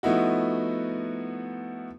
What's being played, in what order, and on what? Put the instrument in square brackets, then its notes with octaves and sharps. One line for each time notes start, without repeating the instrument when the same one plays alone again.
[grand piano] F3 A3 B3 D#4 E4 F#4